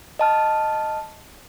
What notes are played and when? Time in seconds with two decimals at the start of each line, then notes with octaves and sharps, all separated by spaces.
0.19 D#5 A5 F6